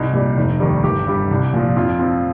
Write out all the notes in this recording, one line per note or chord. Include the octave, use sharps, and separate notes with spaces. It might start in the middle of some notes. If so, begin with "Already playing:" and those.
Already playing: C2 D#4
A#2 G3
F1
D#2 D#3 G3
G1 G4
G2 G3
C2
A#2 F3
F2 F4
F3 C4